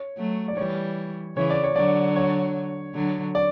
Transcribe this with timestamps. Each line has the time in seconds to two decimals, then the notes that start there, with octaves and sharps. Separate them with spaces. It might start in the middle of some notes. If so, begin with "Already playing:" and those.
Already playing: C#5
0.18 F#3 A3
0.48 D5
0.57 E3 G3 C#5
1.36 C#3 E3 C#5
1.50 D5
1.64 C#5
1.76 D3 F#3 D5
2.16 C#5
2.95 D3 F#3
3.35 D5